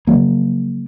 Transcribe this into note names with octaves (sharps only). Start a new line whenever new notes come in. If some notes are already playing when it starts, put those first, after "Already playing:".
C#3 F3 F#3 A#3